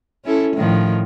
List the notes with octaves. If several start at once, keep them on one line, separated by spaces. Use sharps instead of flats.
C#4 E4 A4
A2 D#3 F3